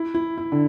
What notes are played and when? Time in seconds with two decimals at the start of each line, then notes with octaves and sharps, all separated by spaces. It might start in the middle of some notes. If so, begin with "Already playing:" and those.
Already playing: E4
0.15 E4
0.38 E4
0.52 D3